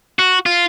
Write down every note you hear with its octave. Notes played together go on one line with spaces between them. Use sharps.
F#4
F4